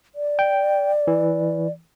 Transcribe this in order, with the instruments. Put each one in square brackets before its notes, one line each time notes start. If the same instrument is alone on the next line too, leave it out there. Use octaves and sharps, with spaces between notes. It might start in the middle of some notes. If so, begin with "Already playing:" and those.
[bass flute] D5
[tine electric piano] G5
E3